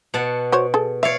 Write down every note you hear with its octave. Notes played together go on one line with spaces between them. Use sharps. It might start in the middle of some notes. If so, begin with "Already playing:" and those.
B2 F#5 A5
F#4 C5 C#5
G#4 A4
C#5 D5 E5 F5